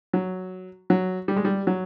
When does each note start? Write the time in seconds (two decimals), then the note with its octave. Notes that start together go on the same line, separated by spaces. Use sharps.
0.13 F#3
0.90 F#3
1.28 G3
1.36 G#3
1.45 G3
1.67 F#3